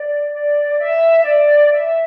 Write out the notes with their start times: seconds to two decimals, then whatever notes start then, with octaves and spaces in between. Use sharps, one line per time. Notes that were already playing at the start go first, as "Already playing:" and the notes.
Already playing: D5
0.31 D5
0.78 E5
1.24 D5
1.72 E5